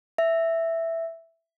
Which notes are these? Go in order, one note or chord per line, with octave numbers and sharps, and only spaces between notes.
E5